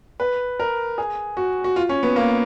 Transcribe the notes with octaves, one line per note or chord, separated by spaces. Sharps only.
B4
A#4
G#4
F#4
F#4
F4
C#4
B3
A#3